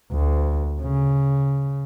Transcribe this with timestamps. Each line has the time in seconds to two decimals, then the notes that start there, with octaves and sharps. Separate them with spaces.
0.12 D2
0.82 C#3